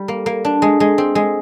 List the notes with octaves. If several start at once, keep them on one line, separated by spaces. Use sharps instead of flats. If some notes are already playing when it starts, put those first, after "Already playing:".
Already playing: G3
A#3
A#3
D4
G#3
G#3
C4
G#3